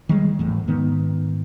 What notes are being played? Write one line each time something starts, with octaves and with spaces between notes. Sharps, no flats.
D#3 G3 G#3
G#1 E2 A2
G#2 D#3 B3